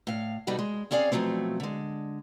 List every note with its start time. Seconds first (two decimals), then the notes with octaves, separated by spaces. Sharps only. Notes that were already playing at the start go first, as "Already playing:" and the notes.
0.07 A2 F5
0.47 B2 G3 D#4 F#4 A4
0.59 G#3
0.91 C4 C#4 G#4 D5 F5
1.12 B2 F3 F#3 A3 C4
1.60 D3 G#3